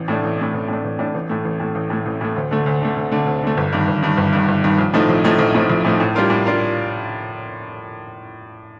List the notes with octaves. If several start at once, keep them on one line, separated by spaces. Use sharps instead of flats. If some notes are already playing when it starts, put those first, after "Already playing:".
Already playing: A1
A2 A3 D4
A1
A2 A3 D4
A1
A2 A3 D4
A1
A2 A3 D4
A1
A2 A3
A1
A2 A3
A1
A2 A3
A1
A2 A3
D2
D3 A3
D2
D3 A3
D2
D3 A3
D2
D3 A3
G1
G2 D#3
G1
G2 D#3
G1
G2 D#3
G1
G2 D#3
A#1
A2 F3 A3 D#4
A#1
A2 F3 A3 D#4
A#1
A2 F3 A3 D#4
A#1
A2 F3 A3 D#4
A2
G3 D4 F4 A#4
A2
G3 D4 F4 A#4